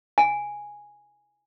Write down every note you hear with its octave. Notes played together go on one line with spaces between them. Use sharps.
G#5